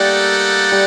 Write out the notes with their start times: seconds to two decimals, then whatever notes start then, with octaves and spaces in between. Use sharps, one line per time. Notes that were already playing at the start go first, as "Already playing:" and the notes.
Already playing: G3 A3 A#3 D#4 A4 D5 F#5
0.72 G3